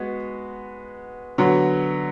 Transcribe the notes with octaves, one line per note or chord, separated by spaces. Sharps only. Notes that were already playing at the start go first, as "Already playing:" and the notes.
Already playing: G#3 B3 F#4
D3 F#3 B3